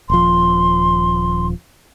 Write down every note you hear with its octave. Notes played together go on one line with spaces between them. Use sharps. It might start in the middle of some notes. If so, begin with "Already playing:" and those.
D#1 F3 C6